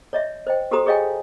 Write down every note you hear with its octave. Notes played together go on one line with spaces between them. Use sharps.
C#5 D#5 E5
C5 D#5 G5
F#4 G4 A4 C5 A#5 D#6
G#4 C#5 D#5 F5 G5 G#5